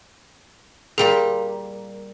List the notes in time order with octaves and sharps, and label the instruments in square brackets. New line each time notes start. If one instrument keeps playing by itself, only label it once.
[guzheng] A#2 G3 A#3 [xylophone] G#4